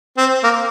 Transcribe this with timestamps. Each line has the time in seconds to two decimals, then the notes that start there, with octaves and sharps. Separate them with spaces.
0.17 C4
0.44 A#3